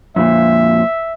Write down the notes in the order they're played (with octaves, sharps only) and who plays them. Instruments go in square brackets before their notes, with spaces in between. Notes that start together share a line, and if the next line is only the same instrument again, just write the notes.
[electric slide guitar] F2 A#2 [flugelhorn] E5